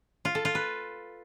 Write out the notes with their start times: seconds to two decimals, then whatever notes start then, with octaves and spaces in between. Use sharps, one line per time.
0.25 F4
0.35 A4
0.45 F4
0.55 B4